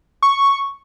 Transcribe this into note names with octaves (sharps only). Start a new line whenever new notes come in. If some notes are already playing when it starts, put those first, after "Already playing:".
C#6